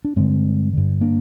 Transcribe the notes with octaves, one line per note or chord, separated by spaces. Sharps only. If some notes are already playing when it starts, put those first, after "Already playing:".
D4
G2 D3 G#3 C4
G2 D3
A#3 D4